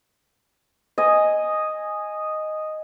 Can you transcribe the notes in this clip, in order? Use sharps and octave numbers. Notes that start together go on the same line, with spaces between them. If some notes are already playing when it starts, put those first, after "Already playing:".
D#5 G#5